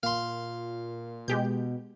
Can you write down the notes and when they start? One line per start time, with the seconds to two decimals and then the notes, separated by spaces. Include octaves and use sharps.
0.03 A#2 F5 C6
1.28 B2 G#3 G4 G6